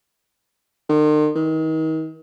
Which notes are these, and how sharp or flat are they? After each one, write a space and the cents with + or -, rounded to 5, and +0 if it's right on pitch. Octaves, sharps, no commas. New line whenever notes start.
D#3 -45
D#3 +35